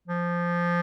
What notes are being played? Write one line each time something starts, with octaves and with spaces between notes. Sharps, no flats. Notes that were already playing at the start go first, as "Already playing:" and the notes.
F3